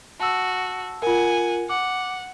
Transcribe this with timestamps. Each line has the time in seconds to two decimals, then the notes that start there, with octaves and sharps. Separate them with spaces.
0.20 F#4 A5 E6
1.02 F4 A#4 F#5 G#5
1.69 F#5 D6